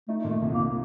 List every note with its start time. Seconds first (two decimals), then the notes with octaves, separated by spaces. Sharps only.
0.08 A3 D#4
0.24 A#2
0.30 A3
0.42 C2
0.54 A#3
0.59 C2